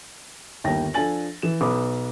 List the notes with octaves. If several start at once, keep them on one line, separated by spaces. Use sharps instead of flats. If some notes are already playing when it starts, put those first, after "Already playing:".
G1 D#2 G5 A#6
F3 D4 A4 G#5 A6 F#7
E3 E7
B1 B4 D6 D#6